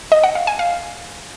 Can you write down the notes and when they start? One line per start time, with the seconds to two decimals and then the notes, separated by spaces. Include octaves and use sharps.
0.12 D#5
0.24 F#5
0.35 F5
0.47 G#5
0.59 F5